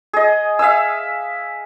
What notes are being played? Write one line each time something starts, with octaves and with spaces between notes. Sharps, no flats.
G#4 D#5
E5 F5 G#5 E6